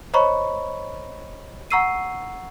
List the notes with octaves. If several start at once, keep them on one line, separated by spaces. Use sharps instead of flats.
C5 C#5 D#5 A#5 B5 C#6
F#5 A#5 C#6 E6 C7 D#7